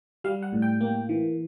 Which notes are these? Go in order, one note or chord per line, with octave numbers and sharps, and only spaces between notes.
G3 F5
F#5
A2
G5
A#3
E3